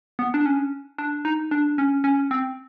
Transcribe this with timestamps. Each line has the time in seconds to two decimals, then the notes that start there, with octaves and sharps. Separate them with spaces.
0.19 B3
0.34 D4
0.46 C#4
0.98 D4
1.25 D#4
1.51 D4
1.78 C#4
2.04 C#4
2.31 C4